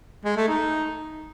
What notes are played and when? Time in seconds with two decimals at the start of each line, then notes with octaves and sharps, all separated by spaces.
0.25 G#3
0.37 A3
0.48 D#4